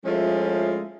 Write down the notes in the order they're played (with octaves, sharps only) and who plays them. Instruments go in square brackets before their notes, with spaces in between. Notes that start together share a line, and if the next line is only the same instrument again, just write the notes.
[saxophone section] F3 G#3 A3 C#4 E4 F4